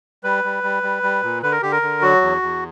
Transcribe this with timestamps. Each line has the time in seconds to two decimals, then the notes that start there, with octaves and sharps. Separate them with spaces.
0.24 G3 B4
0.44 G3
0.64 G3
0.83 G3
1.03 G3
1.23 A#2
1.42 D3 B4
1.52 A#4
1.62 D3 G4
1.71 A#4
1.82 D3
2.02 F#3 F#4
2.21 E2
2.42 E2